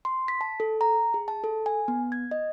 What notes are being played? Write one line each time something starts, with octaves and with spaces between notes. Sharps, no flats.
C6
B6
A5
A4
A#5
G#4
A5
A4
G#5
B3
G#6
D#5